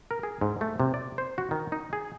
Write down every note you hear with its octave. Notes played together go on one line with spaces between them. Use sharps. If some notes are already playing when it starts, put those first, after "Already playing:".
A#4
G#4
G#2
A3
C3
D5
C5
F#4
D#3
D#4
G#4